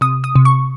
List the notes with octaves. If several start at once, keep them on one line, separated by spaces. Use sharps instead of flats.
C3 D#6
D#6
C3
C#6